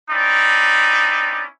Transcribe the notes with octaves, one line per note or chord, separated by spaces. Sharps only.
C4 C#4 D#4 E4 D5